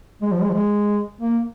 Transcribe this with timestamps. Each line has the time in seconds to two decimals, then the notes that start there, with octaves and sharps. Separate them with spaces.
0.22 G#3
0.32 F3
0.41 G#3
0.49 F3
0.54 G#3
1.21 A#3